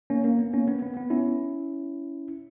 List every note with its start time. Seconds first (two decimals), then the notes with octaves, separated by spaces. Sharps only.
0.10 A#3 C#4
0.24 A#3
0.39 B3
0.53 A#3 C#4
0.68 B3
0.82 B3
0.97 B3
1.10 C#4 E4